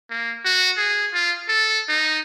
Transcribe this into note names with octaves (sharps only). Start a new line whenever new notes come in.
A#3
F#4
G#4
F4
A4
D#4